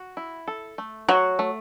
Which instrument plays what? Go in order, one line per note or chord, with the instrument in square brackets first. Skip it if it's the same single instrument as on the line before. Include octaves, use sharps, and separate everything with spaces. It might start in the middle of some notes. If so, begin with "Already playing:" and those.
Already playing: [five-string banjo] F#4
E4
A4
A3
[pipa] F#3 [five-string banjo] F#4
[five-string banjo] A3